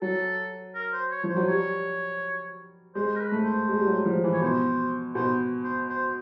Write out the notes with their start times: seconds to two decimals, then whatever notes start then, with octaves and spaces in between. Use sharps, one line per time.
0.02 F#3 A4
0.75 A#4
0.93 C5
1.11 C#5
1.23 F3
1.30 C5
1.37 F#3
1.48 G3 C#5
2.95 G#3 C5
3.16 A#4
3.20 B4
3.31 A3
3.44 C5
3.69 G#3
3.80 G3
3.87 F#3
4.05 F3
4.24 E3
4.33 C#5
4.41 B2 C5
5.15 B2 C5
5.64 C5
5.89 C5